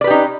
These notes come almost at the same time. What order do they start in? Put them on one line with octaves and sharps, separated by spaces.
D5 B4 G4 D#4 C#4